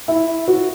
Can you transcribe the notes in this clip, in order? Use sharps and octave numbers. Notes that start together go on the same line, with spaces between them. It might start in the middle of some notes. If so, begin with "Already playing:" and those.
E4
F#4